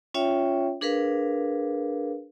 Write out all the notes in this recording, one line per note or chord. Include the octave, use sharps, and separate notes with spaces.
C#4 F4 C#5 E5 G5
D4 G#4 A#4 B4 F5